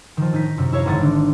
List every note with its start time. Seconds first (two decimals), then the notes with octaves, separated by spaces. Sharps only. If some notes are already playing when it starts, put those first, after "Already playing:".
0.17 D#3 F3
0.32 A2 D#4 G6 B6
0.57 F#2 C3
0.72 E4 C#5 F5 A#5
0.86 G#1 D3 F#5 D#6 F#6 A6
1.01 D3 D#3 D4